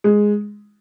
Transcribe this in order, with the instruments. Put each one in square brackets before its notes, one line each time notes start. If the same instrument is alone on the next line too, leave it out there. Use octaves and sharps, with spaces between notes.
[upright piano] G#3